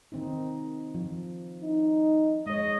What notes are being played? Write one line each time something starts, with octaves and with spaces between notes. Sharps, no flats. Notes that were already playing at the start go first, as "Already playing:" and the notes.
D#3 C4 D#4
F3
D#4
G#3 C#5 D#5